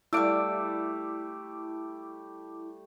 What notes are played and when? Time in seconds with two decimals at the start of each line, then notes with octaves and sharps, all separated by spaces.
0.13 G3 A3 E4 D5 F5 D6 E6 D7